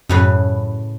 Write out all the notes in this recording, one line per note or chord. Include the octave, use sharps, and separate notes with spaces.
F#2 A2 C#3 B4